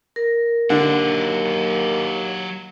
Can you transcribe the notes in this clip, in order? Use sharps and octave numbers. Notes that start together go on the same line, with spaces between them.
A#4
D#2 D3 F#3 D5